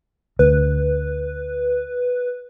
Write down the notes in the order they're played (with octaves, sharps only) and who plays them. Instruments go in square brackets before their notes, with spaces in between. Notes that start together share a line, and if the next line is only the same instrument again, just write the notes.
[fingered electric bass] D2 [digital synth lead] B4